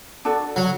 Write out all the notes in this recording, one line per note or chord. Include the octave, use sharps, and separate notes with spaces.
D4 F#4 A4
F#3